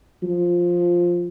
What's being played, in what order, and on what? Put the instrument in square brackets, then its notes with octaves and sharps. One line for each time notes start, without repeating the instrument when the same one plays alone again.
[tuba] F3